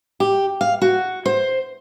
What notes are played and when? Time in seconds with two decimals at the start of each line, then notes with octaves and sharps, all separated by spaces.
0.20 G4
0.61 F5
0.81 F#4
1.26 C5